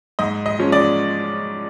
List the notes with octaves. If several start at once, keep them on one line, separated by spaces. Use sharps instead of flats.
G#2 D#5
D#5
F3 G#3 C#4
D5